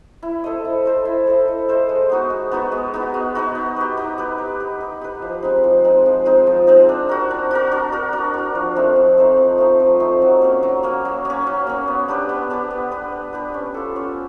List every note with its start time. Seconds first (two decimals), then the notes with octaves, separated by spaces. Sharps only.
0.22 E4
0.44 A4 C5 D#5
0.65 E4
0.85 A4 C5 D#5
1.05 E4
1.27 A4 C5 D#5
1.48 E4
1.68 A4 C5 D#5
1.89 G#3
2.09 B3 D#4 F#4
2.30 G#3
2.52 B3 D#4 F#4
2.72 G#3
2.94 B3 D#4 F#4
3.14 G#3
3.35 B3 D#4 F#4
3.55 D#4
3.76 G4 B4
3.97 D#4
4.18 G4 B4
4.38 D#4
4.60 G4 B4
4.81 D#4
5.01 G4 B4
5.22 F3
5.43 G#3 C4 D#4
5.64 F3
5.84 G#3 C4 D#4
6.06 F3
6.25 G#3 C4 D#4
6.47 F3
6.67 G#3 C4 D#4
6.89 D4
7.09 F#4 A#4
7.31 D4
7.51 F#4 A#4
7.72 D4
7.92 F#4 A#4
8.13 D4
8.34 F#4 A#4
8.55 F3
8.76 A3 C4 D#4
8.96 F3
9.17 A3 C4 D#4
9.37 F3
9.58 A3 C4 D#4
9.80 F3
10.00 A3 C4 D#4
10.22 F#3
10.42 A#3 C#4
10.63 F#3
10.83 A#3 C#4
11.05 F#3
11.25 A#3 C#4
11.47 F#3
11.67 A#3 C#4
11.87 B3
12.08 D4 G4 B4
12.29 B3
12.50 D4 G4 B4
12.71 B3
12.91 D4 G4 B4
13.12 B3
13.33 D4 G4 B4
13.54 C#4
13.74 F4 A4
13.96 C#4